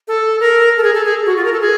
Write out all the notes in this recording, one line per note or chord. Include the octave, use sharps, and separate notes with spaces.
A4
A#4
A4
G#4
A4
G#4
F#4
F4
A#4
A4
G#4